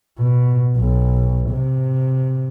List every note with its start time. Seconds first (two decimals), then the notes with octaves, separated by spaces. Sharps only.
0.19 B2
0.78 B1
1.51 C3